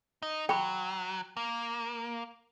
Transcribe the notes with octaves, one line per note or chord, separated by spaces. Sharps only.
D#4
F#3 G5 B5
A#3